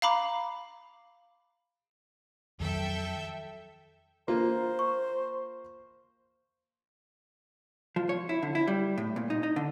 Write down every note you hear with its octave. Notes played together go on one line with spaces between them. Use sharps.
F5 A#5 B5 D6
F2 D#3 F#3 A4 E5 G5
A#3 F4 C5
C#6
F3
C#5
E4
D3
E4
G3
A2
A#2
D#4
D#4
D3